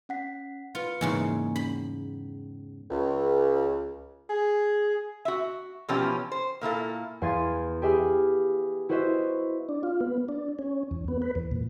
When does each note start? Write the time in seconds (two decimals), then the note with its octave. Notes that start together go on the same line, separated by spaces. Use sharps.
0.09 C#4 F#5 B6
0.75 F4 B4 C#7
1.01 E2 G#2 C#3 A#3 D#5 G#5
1.56 C#4 B5
2.91 C#2
4.30 G#4
5.25 F#4 E5
5.89 B2 E3 F3 B3 C#4 G4
6.32 C5
6.61 A#2 A#3 E4 A4
7.22 E2 F5 C6 G#6 A6 D#7
7.82 G4 G#4 E5 G#5 B5 F6
8.89 E4 F#4 B4 C5 D#5 E5
9.69 D4
9.83 F4
10.01 B3
10.28 D4
10.59 C#4
10.91 E2
11.08 B3
11.22 B4
11.35 E2
11.52 A#2